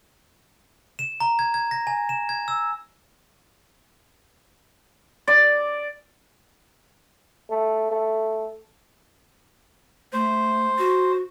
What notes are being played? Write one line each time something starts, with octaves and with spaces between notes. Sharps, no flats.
E7
A#5
G#6
G#6
A#6
G#5
E7
G#6
E6
D5
A3
A3
A3 C5
F#4